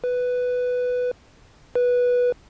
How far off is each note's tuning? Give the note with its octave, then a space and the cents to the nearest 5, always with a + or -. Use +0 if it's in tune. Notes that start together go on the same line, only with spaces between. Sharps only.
B4 +5
B4 -10